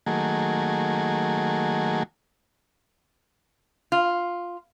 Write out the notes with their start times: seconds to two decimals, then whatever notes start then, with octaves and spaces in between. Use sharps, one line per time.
0.06 D#3 F#3 A3 A#3 G#4
3.92 F4